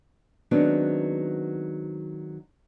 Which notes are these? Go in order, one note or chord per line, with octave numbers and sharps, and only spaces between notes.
D#3 F#3 G#3 B3 C4 D4